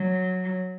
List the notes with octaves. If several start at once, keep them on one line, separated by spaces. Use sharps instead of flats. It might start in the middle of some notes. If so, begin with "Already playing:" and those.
Already playing: F#3